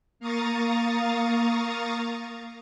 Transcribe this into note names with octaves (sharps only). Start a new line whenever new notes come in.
A#3 F5 A#5 C#6 D#6 A6